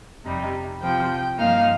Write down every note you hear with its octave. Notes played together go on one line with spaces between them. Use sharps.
F2 C3 G3 D#4
C3 F3 C4 G5
G2 F3 A#3 D#4 F5